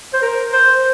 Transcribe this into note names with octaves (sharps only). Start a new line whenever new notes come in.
C5
A#4
C5